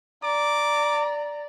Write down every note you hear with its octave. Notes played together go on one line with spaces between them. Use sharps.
D5 A#5 D6